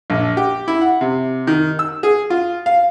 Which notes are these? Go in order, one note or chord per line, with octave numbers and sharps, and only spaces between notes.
A#1
G4
E4
F#5
C3
D#3
E6
G#4
F4
F5